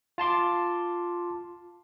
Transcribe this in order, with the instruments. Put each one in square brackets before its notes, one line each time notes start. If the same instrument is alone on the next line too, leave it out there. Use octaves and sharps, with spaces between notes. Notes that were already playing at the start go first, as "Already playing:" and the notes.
[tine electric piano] F4 A5 C6 D6